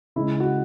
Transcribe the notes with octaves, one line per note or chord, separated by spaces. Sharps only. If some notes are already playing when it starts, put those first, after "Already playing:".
C#3 G#3 E4
F#4